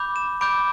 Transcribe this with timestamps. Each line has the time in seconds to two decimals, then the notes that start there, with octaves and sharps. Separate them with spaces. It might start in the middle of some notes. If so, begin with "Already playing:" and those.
Already playing: B5 D6 G6
0.16 E7
0.41 B5 D6 G6 D7